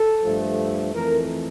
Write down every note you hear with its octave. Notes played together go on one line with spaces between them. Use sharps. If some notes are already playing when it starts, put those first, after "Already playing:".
Already playing: A4
G2 F3 A3
F2 E3 A3 A#4